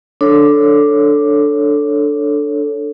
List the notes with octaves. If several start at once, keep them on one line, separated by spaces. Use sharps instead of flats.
D4 A4 C#5